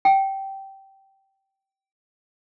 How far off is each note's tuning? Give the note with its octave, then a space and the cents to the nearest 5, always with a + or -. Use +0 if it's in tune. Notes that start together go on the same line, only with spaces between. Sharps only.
G5 -15